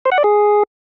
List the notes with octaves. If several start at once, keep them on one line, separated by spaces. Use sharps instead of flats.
C5
F#5
D5
G#4